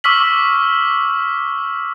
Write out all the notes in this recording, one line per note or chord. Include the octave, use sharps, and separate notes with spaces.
C#6 D6 E6 F6 B6 F#7